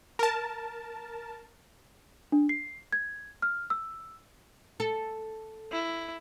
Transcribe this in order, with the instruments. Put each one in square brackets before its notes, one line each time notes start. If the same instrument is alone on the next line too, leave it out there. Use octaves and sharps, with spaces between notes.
[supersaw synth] A#4 A5
[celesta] D4
C7
G#6
F6
E6
[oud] A4
[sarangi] E4